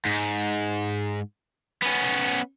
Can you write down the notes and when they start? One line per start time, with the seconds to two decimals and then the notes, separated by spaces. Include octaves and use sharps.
0.06 G#2
1.83 B3 C#4